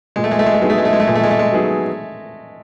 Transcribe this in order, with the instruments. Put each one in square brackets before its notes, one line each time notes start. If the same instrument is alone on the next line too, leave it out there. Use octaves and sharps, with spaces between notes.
[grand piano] A#2 [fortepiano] G#3
[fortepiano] A3
G#3
A3
G#3
A3
[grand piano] F#3 B3 D#4 G#4 [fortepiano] G#3
[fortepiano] A3
G#3
A3
G#3
A3
[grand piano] A#2 [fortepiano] G#3
[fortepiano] A3
G#3
A3
G#3
[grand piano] F#3 B3 D#4 G#4